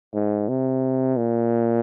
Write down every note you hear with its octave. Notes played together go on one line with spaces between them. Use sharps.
G#2
C3
A#2